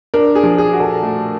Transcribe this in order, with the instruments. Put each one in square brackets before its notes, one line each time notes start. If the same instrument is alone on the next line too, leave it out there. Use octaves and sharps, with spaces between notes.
[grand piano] D4 [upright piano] A#4
[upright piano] G#4
[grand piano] F3
[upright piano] G#4
[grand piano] F#4
[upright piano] A4
[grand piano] A3